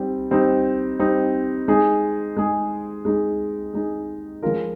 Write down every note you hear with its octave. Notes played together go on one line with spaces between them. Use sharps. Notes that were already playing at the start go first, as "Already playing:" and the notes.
Already playing: G3 C4 D#4
G3 C4 D#4
G3 C4 D#4
G#3 D#4 G#4
G#3 D#4 G#4
G#3 D#4 G#4
G#3 D#4 G#4
F3 G#3 C#4 F4 A#4